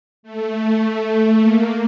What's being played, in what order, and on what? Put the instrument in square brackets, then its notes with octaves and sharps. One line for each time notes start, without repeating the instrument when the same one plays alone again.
[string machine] A3
A#3